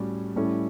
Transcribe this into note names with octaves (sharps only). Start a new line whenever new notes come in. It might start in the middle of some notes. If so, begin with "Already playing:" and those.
Already playing: A2 G3 C#4 F#4
A2 G3 C#4 E4 A4